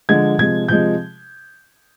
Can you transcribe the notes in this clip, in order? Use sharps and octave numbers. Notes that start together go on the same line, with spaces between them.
D3 F3 G#3 G#6
C3 F3 G#3 G#6
C3 F3 G#3 G6